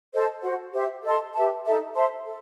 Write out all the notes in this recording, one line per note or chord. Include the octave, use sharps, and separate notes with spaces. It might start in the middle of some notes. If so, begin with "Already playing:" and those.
A4 C5 D#5 A5
F#4 C5 F#5
G4 C5 E5
A4 D#5 A5 C6
G4 B4 E5 A5
D#4 A4 E5 A5
C5 E5 A5 C6
A4